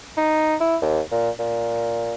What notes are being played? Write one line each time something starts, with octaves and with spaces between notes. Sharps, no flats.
D#4
E4
D#2
A#2
A#2